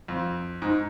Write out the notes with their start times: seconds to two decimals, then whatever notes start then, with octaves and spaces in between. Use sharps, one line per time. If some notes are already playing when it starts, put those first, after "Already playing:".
0.08 F2
0.62 G#2